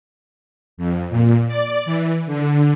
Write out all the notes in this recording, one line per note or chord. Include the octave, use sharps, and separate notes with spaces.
F2
A#2
D5
E3
D3